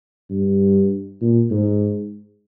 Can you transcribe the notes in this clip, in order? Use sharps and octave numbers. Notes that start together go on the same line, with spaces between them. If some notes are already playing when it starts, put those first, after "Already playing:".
G2
A#2
G#2